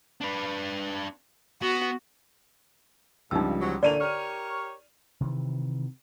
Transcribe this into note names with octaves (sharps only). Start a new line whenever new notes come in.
D4 B4
B3 F#4
C#2 G2 F3 G3 D#4 E6
G#2 F#3
A#2 D3 E3 A3 D5 D#7 F7
G4 A#4 C#5 F6
C3 D#3 E3